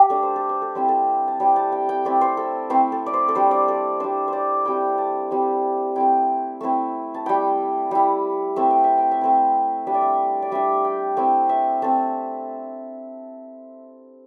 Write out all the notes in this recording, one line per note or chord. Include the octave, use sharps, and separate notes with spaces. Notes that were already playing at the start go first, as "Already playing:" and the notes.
Already playing: G4
A3 D4 A4
C5
A4
C5
A4
G3 C4 E4 C5
A4
A5
G3 C4 E4 G5
A5
G5
G5
A3 C4 E4 D5
C5
A4
A3 C4 E4 C5
A4
D5
C5
A4
G3 D4 C5
D5
A4
G3 D4 C5
C5 D5
G3 C4 E4 G5
A5
G3 C4 E4
A3 C4 E4 G5
A3 C4 E4
A5
G3 E4 G5
G3 E4
A3 C4 E4 E5
G5
E5
G5
E5
A3 C4 E4
G3 D4 E5
D5
E5
D5
G3 D4 E5
G5
A3 C4 E4 G5
E5
A3 C4 A5